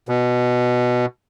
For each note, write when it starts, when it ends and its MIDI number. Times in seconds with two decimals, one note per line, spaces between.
0.09 1.06 47